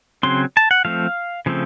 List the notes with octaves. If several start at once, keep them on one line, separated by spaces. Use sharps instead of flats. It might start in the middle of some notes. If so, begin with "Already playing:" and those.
C#3 F#3 C4 C6
A5
F#5
F3 A3 C4 F5
C#3 F3 A3 C4